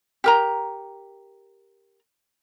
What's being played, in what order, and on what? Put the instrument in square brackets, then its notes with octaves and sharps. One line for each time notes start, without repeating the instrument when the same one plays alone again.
[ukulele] G4 A#4 A#5